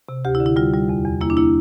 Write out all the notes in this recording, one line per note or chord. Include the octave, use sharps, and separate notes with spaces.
C3
D2 G4
E4
D3
E4
G3 F4
G3
E2
E2
A#3 E4
D4
A#3 E4